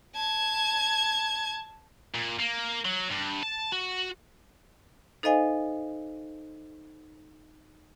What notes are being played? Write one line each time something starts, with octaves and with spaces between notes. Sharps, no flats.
A5 G#6
A#2
A#3
F#3
G2
A5
F#4
D#4 A4 C5 D#5 F5 G#5